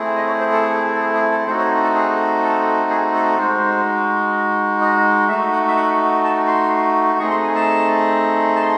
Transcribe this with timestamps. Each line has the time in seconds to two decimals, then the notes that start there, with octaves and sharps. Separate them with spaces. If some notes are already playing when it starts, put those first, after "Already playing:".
Already playing: A3 C4 E4 G#4
0.16 D#5
0.27 C#5
0.40 C5
0.52 A4
0.76 G#4
0.95 A4
1.00 G#4
1.15 G#4
1.31 A4
1.46 A3 C4 D#4 F#4 C5
1.58 C#5
1.83 A4
1.95 G#4
2.43 A4
2.90 G#4
3.14 A4
3.38 G#3 D#4 F#4 C5
4.81 D#5
5.28 A3 D#4 F#4 E5
5.52 F#5
5.68 E5
5.76 F#5
6.24 A5
6.47 C6
7.19 A3 C4 D#4 G#4 C#6
7.31 C6
7.43 G#5
7.55 A5
8.56 A5
8.62 C6